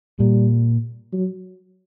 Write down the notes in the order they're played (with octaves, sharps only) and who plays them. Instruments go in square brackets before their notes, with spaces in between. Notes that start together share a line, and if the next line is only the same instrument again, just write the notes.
[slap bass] A#2 [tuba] G3
[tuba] F#3